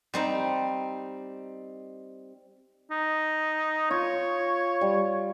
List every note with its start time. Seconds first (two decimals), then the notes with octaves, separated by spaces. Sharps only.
0.14 G3 C4 D#4
2.91 D#4
3.91 F4 C#5
4.81 G3